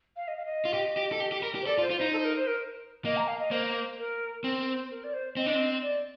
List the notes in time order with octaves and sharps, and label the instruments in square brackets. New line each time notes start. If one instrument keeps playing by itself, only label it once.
[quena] F5
D#5
F5
D#5
[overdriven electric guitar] F4
G4
G4
A4
G4
G4
A#4
G4
[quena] C5
[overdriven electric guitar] A4 [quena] D5
[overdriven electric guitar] F4
[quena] C5
[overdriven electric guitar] F4
[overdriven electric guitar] D#4 [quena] C5
[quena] A4
C5
A#4
C5
A#4
[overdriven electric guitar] A#3 [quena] D#5
[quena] A#5
F5
D#5
[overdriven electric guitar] A#3 [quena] C5
[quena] A#4
[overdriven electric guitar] C4 [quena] A#4
[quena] C5
A#4
D5
C5
[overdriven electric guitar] C4 [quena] D#5
[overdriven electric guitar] D4
C4
[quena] D5